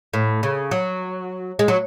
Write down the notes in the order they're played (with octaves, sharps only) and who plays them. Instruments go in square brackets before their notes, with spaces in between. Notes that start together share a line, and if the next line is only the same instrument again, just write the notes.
[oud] A2
C#3
F#3
G#3
F#3